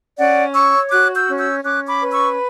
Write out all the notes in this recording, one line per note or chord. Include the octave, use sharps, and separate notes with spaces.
C#4 D5 F#5
C#5 C#6 E6
F#4 D6 F#6
E6 G6
C#4
E6 G6
C#4 D6 F#6
B5 D6
B4
C#6 E6